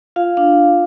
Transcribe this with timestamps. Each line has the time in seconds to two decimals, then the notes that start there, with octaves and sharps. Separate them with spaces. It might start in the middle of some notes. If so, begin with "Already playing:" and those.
0.16 F4 F5
0.37 D4 F5